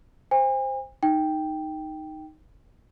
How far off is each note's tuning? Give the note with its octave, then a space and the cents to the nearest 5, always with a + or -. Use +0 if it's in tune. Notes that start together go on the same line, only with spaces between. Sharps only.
C5 +0 G#5 -45
D#4 +0 G5 +0